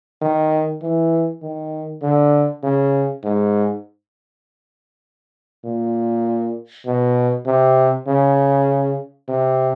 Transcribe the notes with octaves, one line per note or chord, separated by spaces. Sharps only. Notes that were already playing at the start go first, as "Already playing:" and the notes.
D#3
E3
D#3
D3
C#3
G#2
A#2
B2
C3
C#3
C3